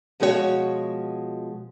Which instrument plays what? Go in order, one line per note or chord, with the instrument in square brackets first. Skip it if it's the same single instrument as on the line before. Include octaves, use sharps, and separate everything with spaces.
[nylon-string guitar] B2 F3 G#3 F#4 G#4 C#5